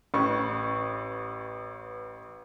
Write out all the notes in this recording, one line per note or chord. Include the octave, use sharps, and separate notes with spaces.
A1 B4 C#6